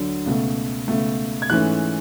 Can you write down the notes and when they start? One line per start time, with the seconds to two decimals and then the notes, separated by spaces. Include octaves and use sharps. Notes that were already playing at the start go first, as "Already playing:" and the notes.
Already playing: D2 D3 F#3
0.26 C#2 B2 A3
0.88 C#2 B2 A3
1.42 G#6
1.50 G#2 E3 A3 C#4 F#6